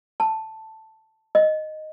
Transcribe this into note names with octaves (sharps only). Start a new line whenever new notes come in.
A5
D#5